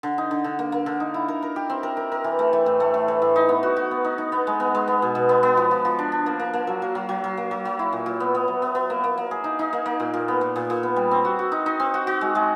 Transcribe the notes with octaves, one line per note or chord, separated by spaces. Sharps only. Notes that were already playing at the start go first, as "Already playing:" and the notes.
D3
D#4
D3
D3
A#3
A#3
D3
D#4
E4
A#4
A#4
G4
C4
A#4
A#4
A#4
E3
A3
E3
A2
A3
A2
E3
A2
D#4
B3
F#4
F#4
B3
D#4
D#4
B3
G#3
B3
G#3
B3
B2
B2
B3
B3
F3
F3
F3
D4
D4
A#3
A#3
A#3
F#3
F#3
F#3
F#3
F#3
A#3
F#3
F#3
E4
A#2
A#2
B3
B3
F#3
B3
B3
A#3
A#3
A#3
G#4
D#4
D#4
A#3
A#3
A#2
A#2
B3
A#2
A#2
A#2
B3
G3
C4
F#4
F#4
D#4
D#4
C4
F#4
F#4
G#3
G#3